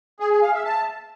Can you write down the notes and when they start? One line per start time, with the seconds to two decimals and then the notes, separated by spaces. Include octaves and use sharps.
0.20 G#4
0.31 G#4
0.42 F5
0.54 E5
0.65 A5